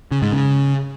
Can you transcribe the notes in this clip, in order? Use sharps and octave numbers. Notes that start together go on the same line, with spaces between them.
C#3
G#2
C#3